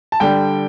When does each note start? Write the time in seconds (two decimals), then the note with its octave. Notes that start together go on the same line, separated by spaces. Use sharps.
0.12 A5
0.20 D3 G3 G5